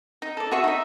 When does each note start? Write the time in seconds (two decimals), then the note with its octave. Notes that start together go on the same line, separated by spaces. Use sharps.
0.22 D#4
0.37 A4 D5
0.51 F#4 G#4 E5 C#6
0.64 D#4 E5